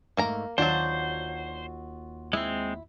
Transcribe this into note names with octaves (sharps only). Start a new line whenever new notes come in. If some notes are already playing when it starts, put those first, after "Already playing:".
G#2 A3 A#3 A#4 A#5
D#2 F#3 D4 F4 F#4 C5
G#3 C4 E4